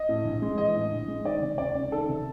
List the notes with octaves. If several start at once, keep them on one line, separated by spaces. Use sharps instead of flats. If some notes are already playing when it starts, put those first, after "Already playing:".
Already playing: D#5
A2
A#1
G#3
E3 D#5
A2
A#1
G#3
D#3 D5
C3
C#2 D5
C#2
D#3 A4
C3